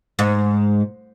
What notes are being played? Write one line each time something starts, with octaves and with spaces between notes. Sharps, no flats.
G#2